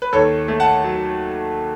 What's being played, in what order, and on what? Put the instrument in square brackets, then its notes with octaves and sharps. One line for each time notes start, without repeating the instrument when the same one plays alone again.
[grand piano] B4
D#2 A4 C#5
A3
F#5 A5
F#3